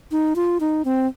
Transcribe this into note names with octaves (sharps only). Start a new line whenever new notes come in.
D#4
F4
D#4
C4